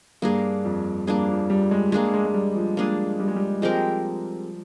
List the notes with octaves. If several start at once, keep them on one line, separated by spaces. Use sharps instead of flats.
G2 A#3 D4 G#4
F2
G2 A#3 D4 G#4
F3
G3
G#3
G#3 A#3 D4 G#4
G#3
G#3
G3
F3
G#3 A#3 D4 G#4
G3
G#3
G3
F3 G#3 C4 G4 A#4